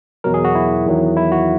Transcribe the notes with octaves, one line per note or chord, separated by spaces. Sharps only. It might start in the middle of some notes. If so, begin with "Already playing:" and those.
E2 B2 F#3 A#4
G#4
F#4
E4
E2 D#3 F#3
E4
F#4